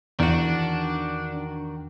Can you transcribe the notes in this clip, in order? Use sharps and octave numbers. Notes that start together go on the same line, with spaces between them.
E2 D#3 D4 F#4